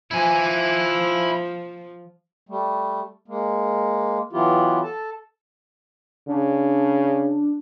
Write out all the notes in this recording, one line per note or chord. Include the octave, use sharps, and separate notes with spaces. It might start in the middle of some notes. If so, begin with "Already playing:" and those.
F3 E4 G#5
G3 A3
G#3 A#3
E3 F#3 B3 E4 F4 G4
A4 A5
C#3 D4